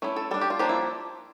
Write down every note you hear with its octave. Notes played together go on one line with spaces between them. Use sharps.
A3 C#4 E4
A4
G3 D4 A4
G4
F4
F3 A#3 D4 G4
E4